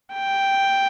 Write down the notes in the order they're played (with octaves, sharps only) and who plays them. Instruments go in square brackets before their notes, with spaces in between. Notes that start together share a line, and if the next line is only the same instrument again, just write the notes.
[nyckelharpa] G5